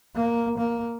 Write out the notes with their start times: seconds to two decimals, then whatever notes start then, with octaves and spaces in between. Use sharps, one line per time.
0.15 A#3
0.58 A#3